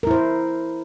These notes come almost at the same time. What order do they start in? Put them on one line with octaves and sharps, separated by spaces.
A#4 E4 C5